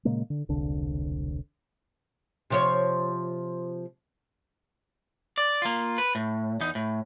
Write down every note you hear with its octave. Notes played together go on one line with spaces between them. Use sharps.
A#2 C#3 G#3 A#3
D3
E1 C2 D3 D4
C3 F3 C#5
D5
A#3 F4
B4
A2
E2 D#4
A2